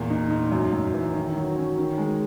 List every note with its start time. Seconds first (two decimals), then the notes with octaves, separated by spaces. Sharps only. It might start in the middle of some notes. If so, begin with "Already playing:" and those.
Already playing: E2 A#2
0.10 D#4
0.31 D#4
0.52 F#2
0.73 F#2
0.94 E3
1.14 D#3
1.35 F#3
1.56 C#4
1.78 D#3
1.98 G#3